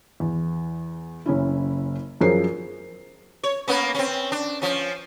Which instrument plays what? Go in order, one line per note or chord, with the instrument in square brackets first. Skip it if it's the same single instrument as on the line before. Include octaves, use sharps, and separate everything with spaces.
[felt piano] E2
F#1 C#4 E4
F#2 F3 G#4 A#4 C5 C7
[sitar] C#5
A#3 B3 C#4
C4 C#4
D4
F3 C#4